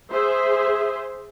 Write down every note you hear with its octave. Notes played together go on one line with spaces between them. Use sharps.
G#4 C5 E5